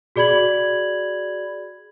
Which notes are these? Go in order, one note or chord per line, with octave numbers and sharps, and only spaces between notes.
F#4 G#4 D5 B5 G#6 F#7